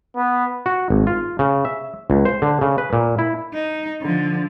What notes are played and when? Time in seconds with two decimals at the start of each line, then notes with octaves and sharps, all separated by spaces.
0.16 B3
0.66 F#4
0.90 G#1
1.07 F4
1.39 C#3
1.65 E5
2.10 C#2
2.25 C5
2.42 D3
2.61 C#3
2.78 B4
2.93 A#2
3.19 E4
3.54 D#4
4.01 D3 F3